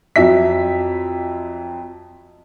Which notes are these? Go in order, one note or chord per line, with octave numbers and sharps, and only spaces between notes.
F2 F#3 E5 B6